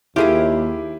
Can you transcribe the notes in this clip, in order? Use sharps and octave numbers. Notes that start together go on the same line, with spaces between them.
D#2 E4 F4 G4 G#4 E5